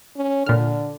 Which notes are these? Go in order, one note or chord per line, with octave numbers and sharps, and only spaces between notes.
C#4
A#2 D3 F6